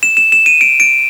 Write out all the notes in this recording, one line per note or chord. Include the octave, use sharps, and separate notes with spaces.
E7
E7
E7
D#7
D7
D7